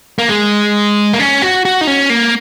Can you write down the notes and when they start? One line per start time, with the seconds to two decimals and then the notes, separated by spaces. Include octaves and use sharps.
0.18 A#3
0.29 G#3
1.13 A#3
1.20 C#4
1.42 F#4
1.65 F#4
1.81 D#4
1.87 C#4
2.10 A#3